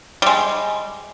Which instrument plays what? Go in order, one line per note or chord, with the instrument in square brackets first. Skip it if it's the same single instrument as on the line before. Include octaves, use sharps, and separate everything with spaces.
[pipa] G3 G#3